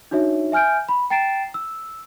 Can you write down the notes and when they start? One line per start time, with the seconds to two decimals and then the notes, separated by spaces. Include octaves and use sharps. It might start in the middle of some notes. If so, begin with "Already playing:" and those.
0.11 D4 D#4 F#4 C#5 E5
0.52 E5 G#5 F6 G6 D7
0.89 B5
1.10 G5 A#5 A6 C7 D7 E7
1.54 E6